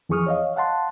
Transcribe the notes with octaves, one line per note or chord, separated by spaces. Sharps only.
F2 E3 G#4 C#6 D#6 F6
C#5 D#5 F5
F5 F#5 A5 C6